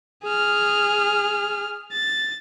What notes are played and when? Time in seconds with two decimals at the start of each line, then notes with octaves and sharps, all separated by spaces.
0.23 G#4 F6
1.92 A6